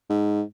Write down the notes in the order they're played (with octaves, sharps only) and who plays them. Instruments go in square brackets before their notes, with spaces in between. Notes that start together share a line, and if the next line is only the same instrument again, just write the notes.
[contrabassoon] G#2